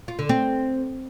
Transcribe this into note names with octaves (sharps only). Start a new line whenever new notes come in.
F4
D3
C4